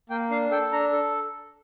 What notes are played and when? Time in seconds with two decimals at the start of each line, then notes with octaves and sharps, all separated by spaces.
0.10 A#3 G5
0.30 D4 F5
0.51 A4 G5
0.72 D4 A#5
0.92 A4